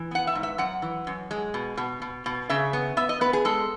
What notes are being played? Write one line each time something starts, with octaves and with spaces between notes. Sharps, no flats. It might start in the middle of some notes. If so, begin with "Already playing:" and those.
Already playing: E3
B3 F#5
E5
G#2
E5
F#2 F#5
E3
F#2
G#3
B2
B2
B2
B2
C#3 E5
B3
B3 E5
D#5
B3 B4
G#4
G#3 A4